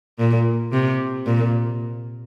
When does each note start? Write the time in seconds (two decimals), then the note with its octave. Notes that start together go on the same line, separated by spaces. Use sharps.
0.19 A#2
0.72 C3
1.26 A#2